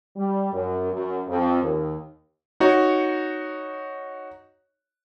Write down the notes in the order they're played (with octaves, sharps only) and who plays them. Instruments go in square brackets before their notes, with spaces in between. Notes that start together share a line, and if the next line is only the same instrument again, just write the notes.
[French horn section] G3
F#2
F#2
F2
D#2
[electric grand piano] D#4 F#4 C#5